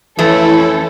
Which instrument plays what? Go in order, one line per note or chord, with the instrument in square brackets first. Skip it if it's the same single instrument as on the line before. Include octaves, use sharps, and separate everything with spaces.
[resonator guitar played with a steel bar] F2 A3 [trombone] E3 [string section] C#4 A4 [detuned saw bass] E4